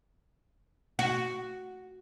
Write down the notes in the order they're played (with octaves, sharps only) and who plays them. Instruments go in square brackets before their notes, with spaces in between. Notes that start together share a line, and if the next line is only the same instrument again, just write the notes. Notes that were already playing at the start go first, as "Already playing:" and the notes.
[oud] F#4